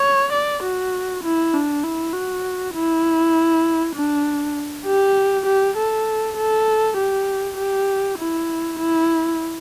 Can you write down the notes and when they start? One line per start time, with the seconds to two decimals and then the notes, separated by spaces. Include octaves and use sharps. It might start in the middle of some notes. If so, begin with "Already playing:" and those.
Already playing: C#5
0.33 D5
0.63 F#4
1.24 E4
1.54 D4
1.83 E4
2.13 F#4
2.74 E4
3.95 D4
4.86 G4
5.46 G4
5.77 A4
6.37 A4
6.98 G4
7.58 G4
8.19 E4
8.79 E4